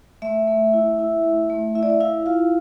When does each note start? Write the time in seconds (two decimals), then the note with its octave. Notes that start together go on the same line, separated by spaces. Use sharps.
0.22 A3 E5
0.47 A3
0.74 E4
0.99 E4
1.24 A3
1.50 A3
1.75 E4 E5
1.83 D5
1.90 E5
2.00 E4 F5
2.26 F4 F5